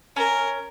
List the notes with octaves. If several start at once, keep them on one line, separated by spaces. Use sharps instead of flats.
C#4 A#4